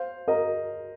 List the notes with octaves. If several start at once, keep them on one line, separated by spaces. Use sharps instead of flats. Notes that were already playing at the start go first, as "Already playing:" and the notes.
Already playing: C5 F5
A#4 D#5